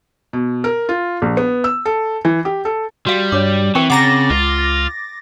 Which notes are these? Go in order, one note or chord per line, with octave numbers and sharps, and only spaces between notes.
B2
A#4
F4
A#1
B3
E6
A4
E3
G4
A4
G3 F#4 F5
G2 C#5 D6
E3 C4 A#4 G5 C#6
C#3 F#5 A#5 D6 A6 A#6
C#2 F4